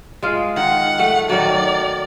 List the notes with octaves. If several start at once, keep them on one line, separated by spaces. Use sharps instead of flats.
G#3 F4
D#3 F#5
A3
D#3 F#3 D5